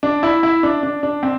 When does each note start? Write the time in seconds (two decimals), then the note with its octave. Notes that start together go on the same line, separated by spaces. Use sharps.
0.03 D4
0.23 E4
0.43 E4
0.63 D4
0.83 D4
1.03 D4
1.23 C4